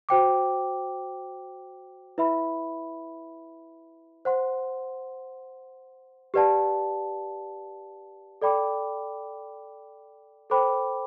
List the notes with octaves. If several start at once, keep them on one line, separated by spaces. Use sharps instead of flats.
F#4 C5 G5 D6
E4 B4 E5 B5
C5 F#5 C6
G4 B4 D5 F#5 A5
A4 D5 G5 B5 D6
A4 C5 G5 B5 D6